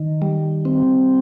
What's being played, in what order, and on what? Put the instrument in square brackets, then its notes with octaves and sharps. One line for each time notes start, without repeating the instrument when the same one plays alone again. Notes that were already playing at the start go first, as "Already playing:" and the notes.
Already playing: [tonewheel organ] D#3
G3
C4